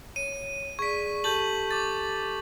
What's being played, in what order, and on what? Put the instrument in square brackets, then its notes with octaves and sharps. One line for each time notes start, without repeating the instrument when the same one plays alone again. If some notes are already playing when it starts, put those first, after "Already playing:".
[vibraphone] C#5 [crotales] D#7
[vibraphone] G#4 D5 [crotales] C#6 B6
[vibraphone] G4 A4 A5 [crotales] G6 F#7
[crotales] D6 A6